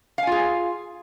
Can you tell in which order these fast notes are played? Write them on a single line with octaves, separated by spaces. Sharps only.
F5 G#5 F4 G#4